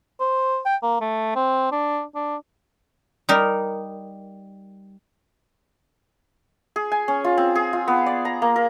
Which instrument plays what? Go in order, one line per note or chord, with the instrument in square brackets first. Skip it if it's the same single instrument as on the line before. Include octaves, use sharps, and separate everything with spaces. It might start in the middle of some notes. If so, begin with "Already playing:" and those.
[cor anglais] C5
G5
A#3
A3
C4
D4
D4
[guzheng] G3 D#4 A#4
[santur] G#4
G#5
C#4
F4
C4
G#4
F4
B3
D5
A#5
A#3
A#4